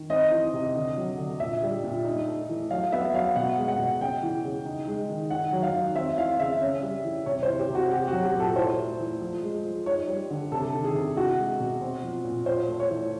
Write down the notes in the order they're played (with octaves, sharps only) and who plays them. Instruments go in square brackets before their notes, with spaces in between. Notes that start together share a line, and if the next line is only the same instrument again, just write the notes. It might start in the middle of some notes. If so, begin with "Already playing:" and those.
Already playing: [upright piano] D#3
C4 D#5
E3
C3
D3
F#3
D3
A#2 E5
G3
A#2
D#4
A3
E3
F#3 F5
B3 E5
F#3 F5
B2 F#5
G#3
F#5
B2
C#3 G5
E3
C#3
D#4
G#3
D#3
D#3 F#5
F#3
F5
D#3
C4 E5
E3 F5
C#3 E5
C#4
G3
E3
C3 C#5
E3 C5
G4
C3 F#4
C4 G4
F#3 F#4
G4
A#2
A4
E4 C5
A3
E3
F3
G#3
F3
D#4 C#5
G3
D3
C3 A4
D#3
G#4
C3
E4 F#4
G#3
B2
C4
F3
A#2
F4 C5
A3
C#5
E3